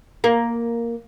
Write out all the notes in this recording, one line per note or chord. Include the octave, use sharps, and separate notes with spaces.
A#3